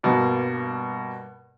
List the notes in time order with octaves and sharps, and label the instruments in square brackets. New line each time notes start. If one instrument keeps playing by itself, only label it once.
[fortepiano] G2 B2 A#3